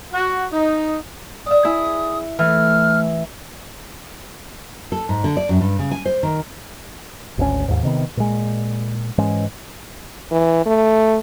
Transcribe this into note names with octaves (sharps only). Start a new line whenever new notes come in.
F#4
D#4
D5 E5 D#6
E4 G#4
E3 A3 F6
A4
G#2
D3
D5
F#2
G2
C#3
G#5
C5
D#3
G#1 D2 C#4
D#2 G#2
C3 D#3 B3
A#2 G#3
G#2 E3 G#3 C#4
E3
A3